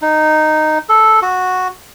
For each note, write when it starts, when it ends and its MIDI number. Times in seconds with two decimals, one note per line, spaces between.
0.02 0.78 63
0.89 1.20 69
1.22 1.68 66